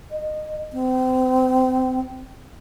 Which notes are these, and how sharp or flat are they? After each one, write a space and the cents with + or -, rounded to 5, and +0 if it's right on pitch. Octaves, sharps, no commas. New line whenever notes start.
D#5 -20
C4 -30